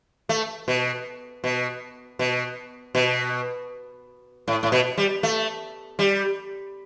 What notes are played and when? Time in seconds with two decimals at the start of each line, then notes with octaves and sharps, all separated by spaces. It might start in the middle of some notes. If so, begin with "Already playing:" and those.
0.29 A3
0.68 B2
1.44 B2
2.19 B2
2.95 B2
4.48 A2
4.63 A2
4.72 B2
4.98 G3
5.23 A3
5.99 G3